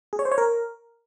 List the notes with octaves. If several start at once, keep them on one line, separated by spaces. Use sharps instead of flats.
G#4
C#5
C5
C#5
A#4